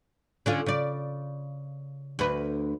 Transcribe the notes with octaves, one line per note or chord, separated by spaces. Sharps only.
D3 C#4 F4
C#3 D5
D2 B4